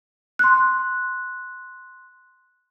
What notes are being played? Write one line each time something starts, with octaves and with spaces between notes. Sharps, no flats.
C6 F#6